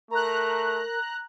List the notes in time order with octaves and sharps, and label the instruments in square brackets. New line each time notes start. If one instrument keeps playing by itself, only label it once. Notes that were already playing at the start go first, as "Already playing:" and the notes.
[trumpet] A3 [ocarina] A#4 [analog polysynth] A#5 F#6